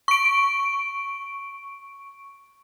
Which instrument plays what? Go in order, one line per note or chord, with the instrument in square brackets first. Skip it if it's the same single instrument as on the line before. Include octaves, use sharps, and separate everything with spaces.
[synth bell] C#6 D7